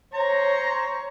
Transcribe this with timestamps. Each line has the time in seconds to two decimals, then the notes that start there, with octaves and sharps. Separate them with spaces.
0.14 C5 C#5 A#5